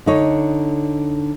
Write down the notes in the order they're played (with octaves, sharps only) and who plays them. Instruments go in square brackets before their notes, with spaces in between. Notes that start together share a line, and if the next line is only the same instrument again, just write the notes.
[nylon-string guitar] D3 D#4 C#5